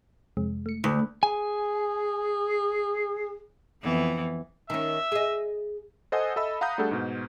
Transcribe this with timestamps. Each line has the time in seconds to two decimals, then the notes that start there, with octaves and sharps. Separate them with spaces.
0.37 F2 C3 G#3
0.66 A3 C#7
0.84 D2 A4 B5
1.23 G#4 G#5
3.82 F2 E3 B3
4.70 D#3 C#4 E5
5.12 G#4 D#5
6.12 A4 C5 D#5 F#5 G#5 D#6
6.36 A4 D#5 E5 B5 E6
6.61 F5 F#5 A#5 B5 D#6 G6
6.78 G3 A3 D4 G#4 A4 F#5
6.91 G#2 B2